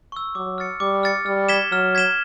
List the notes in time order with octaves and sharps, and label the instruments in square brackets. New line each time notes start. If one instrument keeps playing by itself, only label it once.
[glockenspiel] C#6 E6
[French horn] F#3 [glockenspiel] D6
[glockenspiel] F6 A6 C#7
[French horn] G3 [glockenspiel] D6
[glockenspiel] F6 A6 C#7
[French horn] G3 [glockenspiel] F6
[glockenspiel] G#6 B6 E7 G7
[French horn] F#3 [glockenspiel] F6
[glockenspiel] G#6 B6 E7 G7